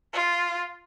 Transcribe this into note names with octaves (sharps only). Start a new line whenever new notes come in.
F4